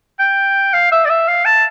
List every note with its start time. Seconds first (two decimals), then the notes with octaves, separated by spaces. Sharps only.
0.19 G5
0.73 F5
0.92 E5
1.05 D5
1.09 E5
1.28 F5
1.45 A5